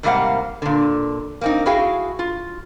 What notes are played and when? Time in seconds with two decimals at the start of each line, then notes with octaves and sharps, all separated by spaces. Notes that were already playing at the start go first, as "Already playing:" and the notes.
0.03 G#2 C3 G3 A#3 F5 F#5
0.62 A#2 D3
1.41 A#3 C4 D#4
1.66 E4 F#4 G#4 F5 G5
2.19 F4